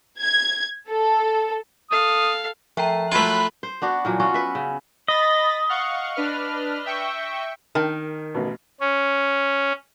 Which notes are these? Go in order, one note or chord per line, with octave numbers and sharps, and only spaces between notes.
G#6
A4
A4 F5 D#6
F3 A3 G5 A#5
F#3 A3 F4 B5 F#6
C5
B3 D4 F#4
A#2 E3 F#3
B3 C#4 F4 F#4
B4 E5
C#3
D#5 B5 A6 A#6
F5 F#5 C#6
D4 B4 F6
E5 G5 C#6
D#3 A#4 G5 A5
A1 B2
C#4